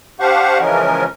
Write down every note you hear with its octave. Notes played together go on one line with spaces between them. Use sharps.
D4 G4 C5 F5 F#5 C#6
C#3 E3 F3 G#3 C#4 A#4